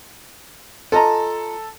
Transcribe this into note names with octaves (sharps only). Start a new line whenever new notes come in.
F4 A4 D#5 A#5